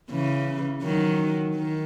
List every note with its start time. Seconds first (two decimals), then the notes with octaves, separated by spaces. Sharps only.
0.11 C#3 E3
0.83 D#3 F#3
1.55 D#3